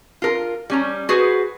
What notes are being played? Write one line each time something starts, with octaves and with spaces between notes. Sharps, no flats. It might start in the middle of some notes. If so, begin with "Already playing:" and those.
F4 A#4
G3 C#4 A#5
F#4 G#4 B4 C5